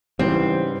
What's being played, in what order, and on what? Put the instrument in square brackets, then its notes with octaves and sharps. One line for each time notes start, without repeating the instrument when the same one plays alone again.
[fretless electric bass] G#2 C#3 [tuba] E3 [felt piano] G3 B4 [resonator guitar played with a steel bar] C4